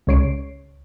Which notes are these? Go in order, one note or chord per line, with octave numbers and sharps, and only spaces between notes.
C#2 C#3 C#5 C7 D7